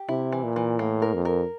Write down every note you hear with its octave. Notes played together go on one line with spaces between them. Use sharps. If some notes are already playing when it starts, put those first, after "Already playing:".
Already playing: G4
C3 E4
E3
A#2
E3
A2 A#3
A#4
F2
A#4